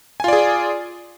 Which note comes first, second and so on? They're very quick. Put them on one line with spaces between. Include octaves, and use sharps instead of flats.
G#5 F4 D5 G#4